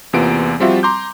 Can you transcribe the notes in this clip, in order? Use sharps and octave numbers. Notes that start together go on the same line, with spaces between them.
E2 C3 A#3 B3 F4 D7
F3 G3 C4 F4 F#4 E5
A#5 C6 D6 G6